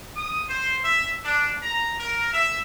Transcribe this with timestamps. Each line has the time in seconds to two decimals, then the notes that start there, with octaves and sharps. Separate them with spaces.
0.16 D#6
0.48 C5
0.84 E5
1.23 D4
1.63 A#5
2.00 A#4
2.32 E5